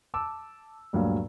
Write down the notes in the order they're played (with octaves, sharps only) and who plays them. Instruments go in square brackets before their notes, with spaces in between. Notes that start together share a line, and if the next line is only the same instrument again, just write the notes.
[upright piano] A5 D6 E6
D2 G2 A#2 F#3 F5